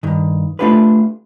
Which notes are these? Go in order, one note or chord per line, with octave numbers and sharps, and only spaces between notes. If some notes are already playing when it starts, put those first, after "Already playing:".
G2 D#3
A3 C4 D4 F4 G4 B4